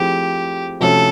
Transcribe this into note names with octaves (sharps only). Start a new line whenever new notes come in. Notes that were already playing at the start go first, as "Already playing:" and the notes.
Already playing: F3 A3 C4 E4 G4 G#4
C3 F3 A3 C#4 F#4 A4